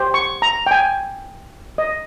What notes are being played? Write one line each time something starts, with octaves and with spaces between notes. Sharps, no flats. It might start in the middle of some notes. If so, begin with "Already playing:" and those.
Already playing: G4 C5
C#6
A#5
G5
G#5
D#5